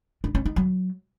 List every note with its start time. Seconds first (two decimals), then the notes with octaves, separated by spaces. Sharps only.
0.24 D4
0.35 C#4
0.45 D#4
0.56 F#3